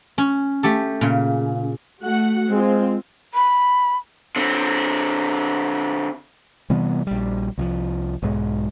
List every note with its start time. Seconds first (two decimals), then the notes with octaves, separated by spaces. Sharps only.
0.18 C#4
0.63 A3 G4 A4
1.01 A#2 C#3
2.01 A3 F#4 F#5
2.48 G#3 C4 F4
3.34 B5
4.36 D3 C4
6.70 C3 E3 G3 B3
7.07 A#1 G3
7.58 C2 E3 F3
8.22 B1 G#2 G#3